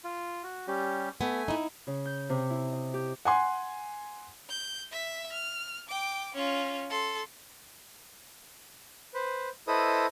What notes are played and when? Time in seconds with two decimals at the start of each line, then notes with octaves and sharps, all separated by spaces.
0.04 F4
0.43 F#4
0.68 G3 C#4 G4
1.21 A3 B3 G#5
1.48 D#4 E4
1.87 C#3
2.05 G6
2.29 C3
2.50 E4
2.72 D#5
2.94 G4
3.25 F#5 G#5 C6
4.49 G6
4.92 E5 B6
5.33 F6
5.89 G5 D6
6.35 C#4 F4
6.90 A4 C6
9.14 B4 C5
9.68 E4 A4 B4 C5 D#5 D#6